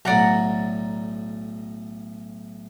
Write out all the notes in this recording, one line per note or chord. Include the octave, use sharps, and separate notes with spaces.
B1 A2 D5 F#5 A#5